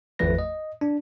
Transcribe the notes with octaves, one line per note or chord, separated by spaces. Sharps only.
G#1 E2 F3 A3 B4 A#6
D#5
D4